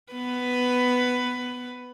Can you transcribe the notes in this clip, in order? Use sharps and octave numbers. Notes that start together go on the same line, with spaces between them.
B3 B4